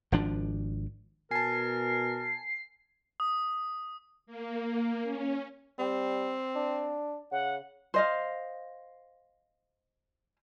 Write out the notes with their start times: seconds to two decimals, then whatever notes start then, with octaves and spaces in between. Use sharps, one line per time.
0.12 G#1 F3 D4
1.31 B2 A#4 G#5 A5 C7
3.20 D#6
4.26 A#3
5.03 C#4
5.79 G3 C4
6.55 D4
7.32 C#3 F#5
7.94 C5 D#5 F5